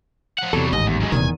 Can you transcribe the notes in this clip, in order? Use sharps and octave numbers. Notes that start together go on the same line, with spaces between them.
F3 F#5
E2 C3 F#3 G3 A4
A1 D#2 G#2 D#5
E2
F#2 G#3
D#1 E2 G2 C3 D#3 A#3 G#5